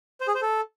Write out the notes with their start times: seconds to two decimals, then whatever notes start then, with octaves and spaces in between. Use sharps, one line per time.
0.21 C5
0.28 G#4
0.35 C5
0.42 A4